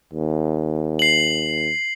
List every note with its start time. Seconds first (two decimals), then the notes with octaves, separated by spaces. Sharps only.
0.13 D#2
0.99 C7 F#7